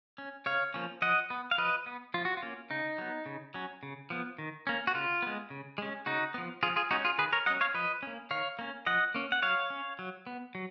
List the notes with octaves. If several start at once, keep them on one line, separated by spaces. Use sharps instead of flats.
C#4
C#3 C#5 F5
F3 A#3 C#4
F3 D#5 F#5
B3
F5
F3 B4 D#5
B3
F3 F4
F#4
F4
A#3 C#4
C#3 D#4
F#3 B3
C#3
F#3 C#4
C#3
F3 B3
D#3
A#3 C#4
F#4
C#3 F4
G#3 B3
C#3
G#3 C#4
C#3 D#4 F#4
F3 B3
F3 F4 G#4
F4 G#4
G#3 C#4 D#4 F#4
F4 G#4
D#3 G#4 B4
A#4 C#5
F#3 C#4 D#5 F#5
C#5 F5
F3 B4 D#5
A#3 C#4
D#3 C#5 F5
A#3 C#4
F3 D#5 F#5
A#3 C#4
F#5
F#3 C#5 F5
C#4
F#3
B3
F#3